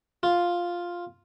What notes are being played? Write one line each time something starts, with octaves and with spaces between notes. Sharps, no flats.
F4